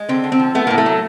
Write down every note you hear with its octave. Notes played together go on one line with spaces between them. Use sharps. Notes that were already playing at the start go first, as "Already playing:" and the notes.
Already playing: G#3
D3 C4
D3
C4
F3
A3 B3
A2 A#3
A3
F#3